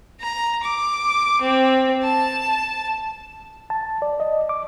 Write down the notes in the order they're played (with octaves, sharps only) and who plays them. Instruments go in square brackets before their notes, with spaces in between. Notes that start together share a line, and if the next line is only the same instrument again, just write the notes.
[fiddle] A#5
D6
C4
A5
[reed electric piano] A5
D5
D#5
D6